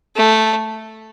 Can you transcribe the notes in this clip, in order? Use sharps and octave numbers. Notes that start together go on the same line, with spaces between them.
A3